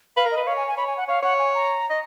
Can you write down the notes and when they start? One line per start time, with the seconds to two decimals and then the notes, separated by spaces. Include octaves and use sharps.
0.17 B4 F5
0.26 A#4
0.31 D#5
0.37 B4
0.46 C#5 F5
0.57 G#5
0.68 G#5
0.77 C#5 B5
0.87 G#5
0.97 F#5
1.08 C#5 F5
1.23 C#5 F#5
1.39 G#5
1.54 A#5
1.90 D#5